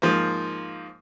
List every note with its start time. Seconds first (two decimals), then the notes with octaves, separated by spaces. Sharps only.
0.02 G#2 F3 A#3